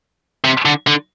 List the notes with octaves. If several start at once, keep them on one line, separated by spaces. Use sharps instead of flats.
C3
D3
D3